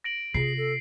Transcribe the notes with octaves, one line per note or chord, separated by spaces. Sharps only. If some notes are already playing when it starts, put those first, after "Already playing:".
A#6 D7 F#7
C3 F4 G#4 C7
A4